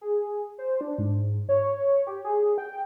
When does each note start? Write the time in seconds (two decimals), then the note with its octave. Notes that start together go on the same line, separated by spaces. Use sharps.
0.01 G#4
0.58 C5
0.81 D4
0.98 G#2
1.49 C#5
2.07 G4
2.24 G#4
2.58 G5